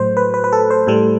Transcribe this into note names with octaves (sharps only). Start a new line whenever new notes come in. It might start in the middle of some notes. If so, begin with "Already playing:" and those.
Already playing: A2 F#3 A3 C5
B4
B4
B4
A4
C5
A2 G3 A4